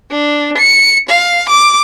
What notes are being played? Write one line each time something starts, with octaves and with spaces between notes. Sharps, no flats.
D4
C#7
F5
D6